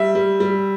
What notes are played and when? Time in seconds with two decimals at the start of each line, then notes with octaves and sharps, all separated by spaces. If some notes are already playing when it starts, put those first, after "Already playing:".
Already playing: G3 E5
0.15 G3
0.40 G3